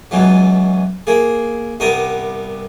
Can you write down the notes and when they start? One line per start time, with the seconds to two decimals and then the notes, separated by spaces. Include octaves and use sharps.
0.11 C#2 B2 E3 F#3
1.07 A#3 G#4
1.80 C2 G2 B3 A#4 D#6